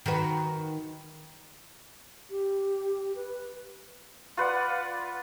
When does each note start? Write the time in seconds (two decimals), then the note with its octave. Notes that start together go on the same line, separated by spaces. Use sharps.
0.06 D#3 F#4 B4
2.31 G4
3.16 B4
4.37 F4 B4 D5 F#5